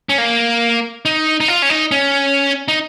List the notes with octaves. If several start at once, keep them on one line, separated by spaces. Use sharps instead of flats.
C#4
A#3
D#4
D#4
F4
C#4
D#4
C#4
D#4